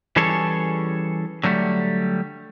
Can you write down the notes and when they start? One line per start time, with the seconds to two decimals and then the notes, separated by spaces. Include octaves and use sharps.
0.16 E3 G3 C#4 G#4 A4 C#5
1.44 D3 F#3 G3 A3